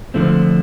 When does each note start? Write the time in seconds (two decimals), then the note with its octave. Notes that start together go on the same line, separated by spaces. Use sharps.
0.14 D3 F3 A3 C4